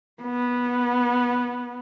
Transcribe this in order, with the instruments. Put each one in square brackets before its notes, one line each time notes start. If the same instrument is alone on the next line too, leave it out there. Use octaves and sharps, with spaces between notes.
[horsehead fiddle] B3